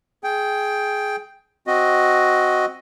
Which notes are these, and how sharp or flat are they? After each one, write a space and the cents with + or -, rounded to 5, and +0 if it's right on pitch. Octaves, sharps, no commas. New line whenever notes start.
G#4 +15 G5 +0
C4 +0 F#4 +0 D#5 +0